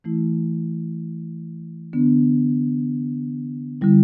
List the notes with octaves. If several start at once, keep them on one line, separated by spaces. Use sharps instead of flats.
E3 A3 E4
D3 B3 D4
D3 G3 E4